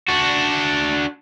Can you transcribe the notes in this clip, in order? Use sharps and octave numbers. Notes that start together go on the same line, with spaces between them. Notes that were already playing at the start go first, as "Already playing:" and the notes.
D4 F#4